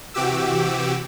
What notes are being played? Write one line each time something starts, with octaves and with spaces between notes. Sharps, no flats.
C3 E3 F#4 G4 D6 E6